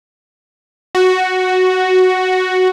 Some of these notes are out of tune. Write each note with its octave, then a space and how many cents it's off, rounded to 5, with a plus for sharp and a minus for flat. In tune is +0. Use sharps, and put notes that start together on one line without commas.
F#4 +0